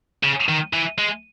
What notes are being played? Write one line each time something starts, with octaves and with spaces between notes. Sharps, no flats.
C#3
D#3
E3
G#3